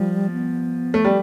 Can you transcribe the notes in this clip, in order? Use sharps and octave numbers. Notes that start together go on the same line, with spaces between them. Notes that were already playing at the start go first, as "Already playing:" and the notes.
Already playing: F3 G3
B3
A3
G3